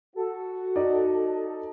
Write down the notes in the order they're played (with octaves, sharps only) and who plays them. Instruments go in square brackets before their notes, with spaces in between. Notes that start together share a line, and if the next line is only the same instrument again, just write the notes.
[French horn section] F#4 [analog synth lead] A4
[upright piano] D#4 D5